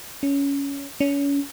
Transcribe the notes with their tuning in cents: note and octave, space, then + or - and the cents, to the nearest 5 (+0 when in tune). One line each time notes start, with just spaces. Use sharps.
C#4 +15
C#4 +30